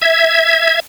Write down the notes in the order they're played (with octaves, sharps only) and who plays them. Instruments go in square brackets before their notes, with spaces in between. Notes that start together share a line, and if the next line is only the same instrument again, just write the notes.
[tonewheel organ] E5 G#6